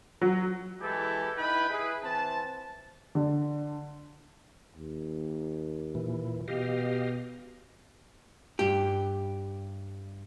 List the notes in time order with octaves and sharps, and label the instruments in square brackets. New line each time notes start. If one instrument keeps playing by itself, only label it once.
[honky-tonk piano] F#3
[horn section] E3 G#3 E4 G4 A4
D#4 E4 B4 G5 B5
E4 G#4 B4
E3 C4 A5
[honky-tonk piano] D3
[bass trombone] D#2
[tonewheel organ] A#2 E3
[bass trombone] B2 [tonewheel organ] G4 D#5 F5
[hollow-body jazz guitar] G2 G4